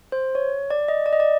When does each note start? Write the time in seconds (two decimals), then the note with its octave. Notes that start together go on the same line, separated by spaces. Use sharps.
0.12 C5
0.35 C#5
0.70 D5
0.88 D#5
1.06 D5
1.13 D#5
1.20 D5